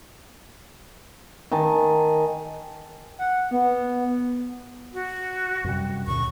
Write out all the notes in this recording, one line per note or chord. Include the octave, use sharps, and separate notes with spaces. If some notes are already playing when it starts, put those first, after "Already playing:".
D#3 D#5 G#5 A5
F#5
B3
F#4
F#2 C3 G3
D2 A#2 C#3 C#6